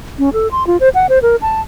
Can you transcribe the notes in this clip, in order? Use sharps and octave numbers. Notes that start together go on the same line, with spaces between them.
C#4
A4
C6
F4
C5
F#5
C5
A#4
A5